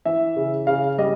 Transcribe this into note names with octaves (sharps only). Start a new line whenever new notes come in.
E3 E5
C#3
C#3 F5
G3 D#5